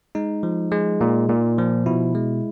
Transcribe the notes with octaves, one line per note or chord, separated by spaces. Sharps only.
G#3 D#4
F3
G#3
A#2
A#2
F3
B2 E4
G#3